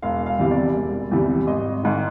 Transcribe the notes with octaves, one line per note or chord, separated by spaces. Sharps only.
E1 F5
F5
E2 C3 E3 G3
D5
E1
E2 C3 E3 G3
G#1 D#5
G#2 D#3